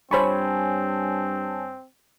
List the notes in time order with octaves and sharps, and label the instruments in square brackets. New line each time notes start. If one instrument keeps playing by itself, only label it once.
[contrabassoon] G2 [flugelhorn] C4 [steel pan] C5 B5 C#6 [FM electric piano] C#5 G#5 A5